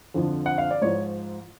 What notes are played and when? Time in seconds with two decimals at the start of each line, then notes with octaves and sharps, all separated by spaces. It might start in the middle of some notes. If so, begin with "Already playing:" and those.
0.14 F2 D3 F3
0.46 F#5
0.58 F5
0.71 D5
0.82 G#2 F3 C#5